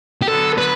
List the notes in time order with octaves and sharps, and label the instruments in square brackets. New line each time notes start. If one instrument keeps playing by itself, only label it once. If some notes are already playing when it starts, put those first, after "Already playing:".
[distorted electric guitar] G4
[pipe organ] D3 F#3 B3 [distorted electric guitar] A4
[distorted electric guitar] B4